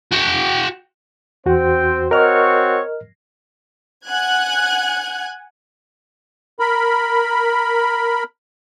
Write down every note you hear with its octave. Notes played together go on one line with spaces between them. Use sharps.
F#4 G5
E2 C4 F#4 C5 G5
C4 F#4 A#4 C#5 D#5 F6
F#5 G#5 F#6 G#6
A#4 B5